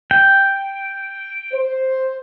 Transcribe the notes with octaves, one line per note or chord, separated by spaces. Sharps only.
G5
C5